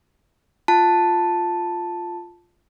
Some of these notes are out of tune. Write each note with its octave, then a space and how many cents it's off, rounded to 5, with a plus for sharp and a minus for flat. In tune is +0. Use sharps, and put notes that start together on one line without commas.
F4 +0 A5 +0